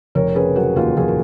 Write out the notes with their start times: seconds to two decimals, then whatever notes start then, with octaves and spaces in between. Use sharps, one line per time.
0.15 F1 A#4 C#5
0.35 C#3 G#4 B4
0.56 F#3 F#4 A#4
0.76 D#2 F4 G#4
0.97 F1 F4 G#4
1.08 A#4